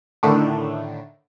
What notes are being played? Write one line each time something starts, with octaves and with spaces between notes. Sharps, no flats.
A2 D3 D#3 A3 D4